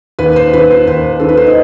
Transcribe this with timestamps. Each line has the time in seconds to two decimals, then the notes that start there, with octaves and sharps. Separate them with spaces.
0.19 D#2 B4
0.36 C5
0.53 D#3 B4
0.71 C5
0.87 D#2 C5
1.20 D#3 A4
1.29 B4
1.37 C5
1.46 D#5